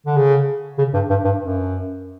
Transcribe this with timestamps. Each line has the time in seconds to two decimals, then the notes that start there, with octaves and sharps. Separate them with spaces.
0.06 D3
0.17 C#3
0.78 C#3
0.94 G2
1.10 G2
1.25 G2
1.41 F#2